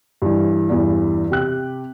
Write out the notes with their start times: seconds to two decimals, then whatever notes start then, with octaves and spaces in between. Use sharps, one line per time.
0.22 G2 E3
0.70 E2 G2 E3
1.30 C3 G4 F#6